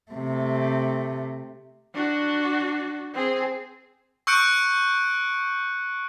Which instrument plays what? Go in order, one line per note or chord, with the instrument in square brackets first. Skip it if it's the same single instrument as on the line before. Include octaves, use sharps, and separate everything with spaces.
[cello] C3 A3
[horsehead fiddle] D4 F#4
C4 G#4
[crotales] C#6 E6 F#6 G6 C#7 D7